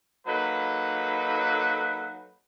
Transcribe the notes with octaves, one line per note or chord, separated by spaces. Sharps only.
F#3 A#3 D#4 A4 B4